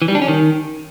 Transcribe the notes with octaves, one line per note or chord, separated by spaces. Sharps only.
E3
G3
D4
C#4
D#3